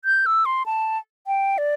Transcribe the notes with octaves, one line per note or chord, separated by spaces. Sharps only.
G6
E6
C6
A5
G5
D5